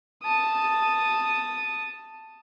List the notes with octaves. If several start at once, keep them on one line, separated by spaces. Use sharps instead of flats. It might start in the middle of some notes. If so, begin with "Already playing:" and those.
A5 D#6